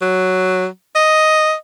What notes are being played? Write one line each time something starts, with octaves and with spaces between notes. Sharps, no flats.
F#3
D#5